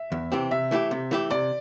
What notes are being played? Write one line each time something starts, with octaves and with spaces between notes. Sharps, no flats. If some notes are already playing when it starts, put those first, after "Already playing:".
Already playing: E5
E2
C3 E3 C4 G4
C3 E5
E3 A3 E4 G4
C3
E3 A3 E4 G4
C3 D5